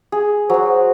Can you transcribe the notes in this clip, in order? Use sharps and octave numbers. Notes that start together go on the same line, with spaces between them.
G#4
F#3 F#4 C5